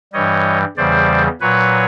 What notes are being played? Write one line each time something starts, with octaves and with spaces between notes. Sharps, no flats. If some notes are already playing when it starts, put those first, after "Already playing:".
G2 E3 G3 C#5 D#5
E2 C#3 E3 G3 C5 D5
A#2 F#3 B4 C#5